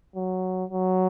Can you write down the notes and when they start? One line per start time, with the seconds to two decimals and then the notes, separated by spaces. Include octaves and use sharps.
0.16 F#3
0.70 F#3